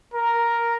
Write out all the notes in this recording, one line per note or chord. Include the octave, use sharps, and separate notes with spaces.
A#4